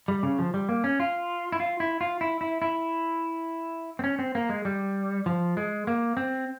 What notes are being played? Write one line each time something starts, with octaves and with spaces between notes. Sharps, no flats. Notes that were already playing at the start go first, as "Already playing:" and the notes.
G3
C#3
F3
G3
A#3
C#4
F4
E4
F4
E4
F4
E4
E4
E4
C4
C#4
C4
A#3
G#3
G3
F3
G#3
A#3
C4